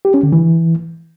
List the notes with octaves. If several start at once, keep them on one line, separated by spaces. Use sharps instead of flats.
G4
C#4
D3
E3